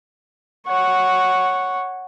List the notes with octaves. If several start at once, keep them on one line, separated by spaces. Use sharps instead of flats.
C#5 F#5